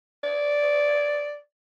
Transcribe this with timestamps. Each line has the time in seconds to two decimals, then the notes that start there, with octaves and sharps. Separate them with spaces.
0.24 D5